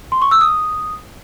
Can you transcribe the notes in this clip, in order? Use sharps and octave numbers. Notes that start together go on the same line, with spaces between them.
C6
C#6
E6
D#6